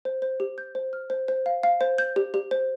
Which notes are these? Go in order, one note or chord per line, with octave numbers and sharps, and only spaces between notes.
C5
C5
G4
G6
C5
F6
C5
C5
F5
F5
C5
G6
G4
G4
C5